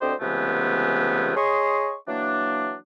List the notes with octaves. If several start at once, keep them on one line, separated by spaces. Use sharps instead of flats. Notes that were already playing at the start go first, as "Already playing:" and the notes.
D2 D3 C4 G4 C5 D#5
C#2 C3 E3 G#3 A3 B3
G#4 C#5 D#5 C6 C#6
E3 F#3 A#3 D4